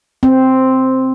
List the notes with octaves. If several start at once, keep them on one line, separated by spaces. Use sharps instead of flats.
C4